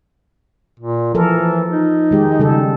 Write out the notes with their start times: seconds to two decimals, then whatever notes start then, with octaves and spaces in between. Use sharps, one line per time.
0.79 A#2
1.14 E3 F3 A4 A#4
1.70 D#4
2.11 D#3 G#3 G4
2.39 C#3 G3 A4